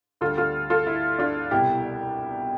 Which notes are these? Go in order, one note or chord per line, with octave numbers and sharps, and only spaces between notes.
D2 D3 G3 F4 A4
F4 A4
F4 A4
E4
D4 F4
C2 B2 G3 E4 G4